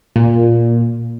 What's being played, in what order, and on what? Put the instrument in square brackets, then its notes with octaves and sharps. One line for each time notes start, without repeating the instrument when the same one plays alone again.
[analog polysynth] A#2